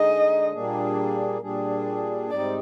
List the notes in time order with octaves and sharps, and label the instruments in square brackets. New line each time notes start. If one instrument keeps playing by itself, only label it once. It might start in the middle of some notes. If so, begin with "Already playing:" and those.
Already playing: [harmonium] D3 G#3 D#4 G#4 [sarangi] D#5
[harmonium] A#2 G3 A#3 D4 G#4
A#2 G3 D4 G#4
[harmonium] G#2 G3 C4 D#4 [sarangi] D5